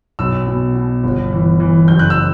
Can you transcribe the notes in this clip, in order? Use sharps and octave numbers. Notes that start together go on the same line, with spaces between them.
B1 E6
B2
B2
G1
E3
E3
F#1 G6
F#6
E6